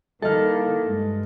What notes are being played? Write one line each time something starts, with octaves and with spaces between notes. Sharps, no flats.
D#3 G3 A#3 E4 A4 D#5 F6
G2 G#3